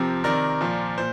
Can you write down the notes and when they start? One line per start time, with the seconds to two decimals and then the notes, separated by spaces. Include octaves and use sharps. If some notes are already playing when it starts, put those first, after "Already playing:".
Already playing: C3 F3 G4 A#4
0.24 C3 D#3 A#4 D5
0.61 A#2 F3
0.98 A#2 C5